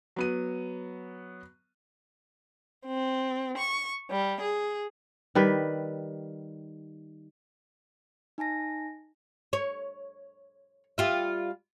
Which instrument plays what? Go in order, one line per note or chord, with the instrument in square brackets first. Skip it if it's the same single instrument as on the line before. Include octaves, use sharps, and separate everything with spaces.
[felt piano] F#3 B3 D#7
[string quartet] C4
C#6
G3
G#4
[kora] D#3 G3 B4
[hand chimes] D#4 G#5 A5 A#6
[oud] C#5
G3 F4 E5